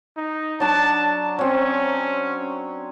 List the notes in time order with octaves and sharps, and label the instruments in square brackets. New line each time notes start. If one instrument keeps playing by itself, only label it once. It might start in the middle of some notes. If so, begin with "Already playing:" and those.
[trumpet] D#4
[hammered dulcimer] F#3 D4 [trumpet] A5
[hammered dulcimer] F#3 C4 [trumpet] C#4